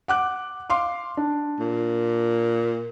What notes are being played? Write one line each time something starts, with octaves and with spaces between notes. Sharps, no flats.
F#5 D6 F#6
F5 C6 D6
D4
A#2